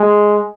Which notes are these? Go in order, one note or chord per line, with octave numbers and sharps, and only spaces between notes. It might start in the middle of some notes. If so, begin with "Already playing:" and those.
Already playing: G#3